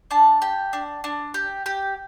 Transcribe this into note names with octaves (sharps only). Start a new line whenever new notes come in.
D4 A5
G4
D4
D4
G4
G4